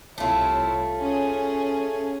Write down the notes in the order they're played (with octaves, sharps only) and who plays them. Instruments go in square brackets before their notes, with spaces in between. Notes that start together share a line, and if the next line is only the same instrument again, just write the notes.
[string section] C2 E4 C#5 [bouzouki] A3 F4
[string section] C#4 G#4